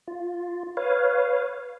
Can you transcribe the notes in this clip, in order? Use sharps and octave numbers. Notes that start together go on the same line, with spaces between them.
F4
B4 C#5 F5